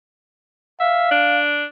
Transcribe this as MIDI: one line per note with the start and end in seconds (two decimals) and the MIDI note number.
0.80 1.11 76
0.80 1.40 77
1.11 1.65 62